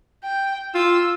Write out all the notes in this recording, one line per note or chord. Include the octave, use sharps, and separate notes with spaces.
G5
F4 E6